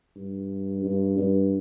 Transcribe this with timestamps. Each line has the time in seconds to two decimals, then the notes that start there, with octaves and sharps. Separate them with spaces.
0.16 G2
0.84 G2
1.18 G2